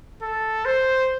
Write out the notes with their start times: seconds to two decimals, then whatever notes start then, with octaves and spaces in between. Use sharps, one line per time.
0.22 A4
0.65 C5